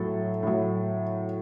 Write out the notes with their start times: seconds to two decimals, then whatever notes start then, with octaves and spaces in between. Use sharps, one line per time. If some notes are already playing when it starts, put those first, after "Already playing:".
Already playing: A2 F#3 A4
0.43 A2 F#3